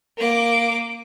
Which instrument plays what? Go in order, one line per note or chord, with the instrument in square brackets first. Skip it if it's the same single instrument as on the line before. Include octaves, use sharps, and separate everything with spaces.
[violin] A#3 D6